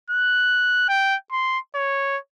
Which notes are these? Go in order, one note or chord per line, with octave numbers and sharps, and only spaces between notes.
F#6
G5
C6
C#5